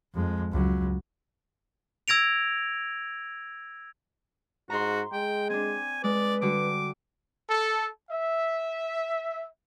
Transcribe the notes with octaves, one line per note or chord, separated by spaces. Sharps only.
F2 G#3
C#2 F#3
E6 G#6 A#6 D7 F7
G#2 F#4 A#5 C6
G#3 G5
C4 D4 G#5
G#3 B4 D5
D3 G3 F#4 D6
A4
E5